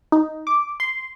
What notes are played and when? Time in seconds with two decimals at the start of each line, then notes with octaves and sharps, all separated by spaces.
0.12 D#4
0.47 D6
0.80 C6